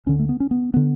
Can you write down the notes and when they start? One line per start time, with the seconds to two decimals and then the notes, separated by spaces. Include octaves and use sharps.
0.06 D2 D3 C#4
0.19 A3
0.29 B3
0.40 C#4
0.51 B3
0.74 D3 B3